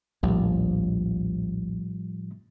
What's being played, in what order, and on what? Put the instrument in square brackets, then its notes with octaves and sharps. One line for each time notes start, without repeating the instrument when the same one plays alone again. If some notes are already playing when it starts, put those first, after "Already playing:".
[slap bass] A#1 D#2 [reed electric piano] A2 F3 G3